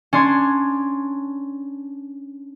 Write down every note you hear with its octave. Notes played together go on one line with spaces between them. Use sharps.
C#4 D4 C6 G#6